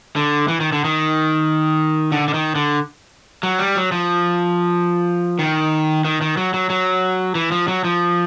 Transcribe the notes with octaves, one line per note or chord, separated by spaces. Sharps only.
D3
E3
D#3
D3
D#3
D3
D3
D#3
D3
F#3
G3
F#3
F3
D#3
D#3
D#3
F#3
F#3
F#3
E3
F3
F#3
F3